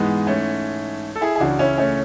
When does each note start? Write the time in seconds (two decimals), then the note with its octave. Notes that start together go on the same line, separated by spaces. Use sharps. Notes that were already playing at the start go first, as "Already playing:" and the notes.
Already playing: G#2 E3 G#3 B3
0.27 A3 C#4
1.15 A4
1.21 E4 G#4
1.36 G#4
1.40 C#2 C#3 E3 D4 F#4
1.59 C#4 E4
1.78 A3 C#4